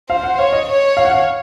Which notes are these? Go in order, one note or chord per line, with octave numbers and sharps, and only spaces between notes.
C5 F5
F#5
C#5 F5
D#5
C#5
F5
F#5
F5